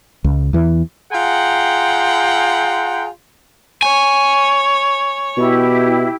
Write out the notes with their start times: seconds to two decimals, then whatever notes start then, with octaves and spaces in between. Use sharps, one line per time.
0.24 C#2
0.53 E2 E3
1.13 F4 G#4 F#5 G5 A#5 C6
3.83 C#5 G#5
5.37 B2 E4 G4